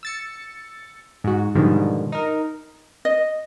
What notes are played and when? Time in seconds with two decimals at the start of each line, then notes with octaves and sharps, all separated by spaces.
0.03 E6 A6 C#7
1.24 G#2 F#4
1.55 G#2 B2 D3 D#3 F3 G3
2.12 D#4 A#4
3.05 D#5